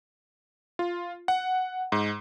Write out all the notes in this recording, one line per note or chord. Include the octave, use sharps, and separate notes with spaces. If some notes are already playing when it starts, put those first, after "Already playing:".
F4
F#5
G#2